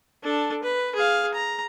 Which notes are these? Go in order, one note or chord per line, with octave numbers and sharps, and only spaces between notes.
D4 A4
B4
G#4 F5
A#5